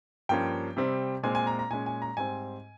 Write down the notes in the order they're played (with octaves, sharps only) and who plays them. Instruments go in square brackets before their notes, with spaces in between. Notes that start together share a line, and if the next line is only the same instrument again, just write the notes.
[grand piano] G2 F3 A#3 C#4 G5
C3 G3 C4
A#2 G#3 C4 G#5
G#5
A#5
A#5
A#2 G#3 C#4 G#5
G#5
A#5
G#2 G3 C4 G#5